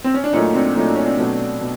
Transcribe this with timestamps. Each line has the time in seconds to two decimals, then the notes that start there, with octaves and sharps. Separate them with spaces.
0.04 C4
0.14 C#4
0.24 D4
0.33 A#2 F#3 A3 C#4 D#4
0.55 C4 D4
0.76 A#2 F#3 A3 D#4
0.86 D4
0.95 C#4
1.05 C4 D4
1.18 B2 F#3 A3
1.61 B2